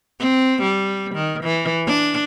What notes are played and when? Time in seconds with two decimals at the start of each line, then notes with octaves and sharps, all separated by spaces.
0.20 C4
0.62 G3
1.15 D#3
1.44 E3
1.86 D4